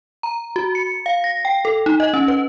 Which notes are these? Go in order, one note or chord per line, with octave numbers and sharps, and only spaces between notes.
A#5
F#4
C#7
F5
A#6
G5
A4
D#4
D#5
C#4
B4